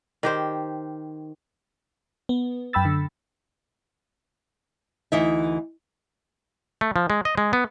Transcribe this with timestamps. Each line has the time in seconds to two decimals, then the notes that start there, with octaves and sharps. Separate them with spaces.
0.23 D#3 G4 C5
2.29 B3
2.73 F#2 G5 B5 E6 A6
2.85 D3
5.12 D2 E3 D#4 E5
6.81 A3
6.96 F3
7.10 G#3
7.25 D#5
7.38 G#3
7.53 B3